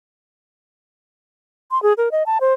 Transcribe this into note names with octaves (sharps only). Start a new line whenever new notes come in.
C6
G#4
A#4
D#5
A5
C5